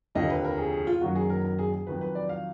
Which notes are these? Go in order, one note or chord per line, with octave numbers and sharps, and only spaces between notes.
F1 D#2 D3 F3 D#5
B4
A#4
G#4
G#4
F4
F#1 F#2 D#3 F#3 F#4
G#4
A#4
A#4
G#4
G#4
F2 D#3 F#3 B4
B4
D5
F5